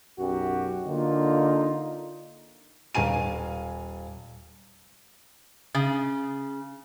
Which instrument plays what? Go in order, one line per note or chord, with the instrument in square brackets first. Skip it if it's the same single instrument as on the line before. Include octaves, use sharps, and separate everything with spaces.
[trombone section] B1 F#2 F#4 G4
D3 A#3 D#4 F4
[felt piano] D#1 F5 G#5 D#7
[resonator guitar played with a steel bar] C#3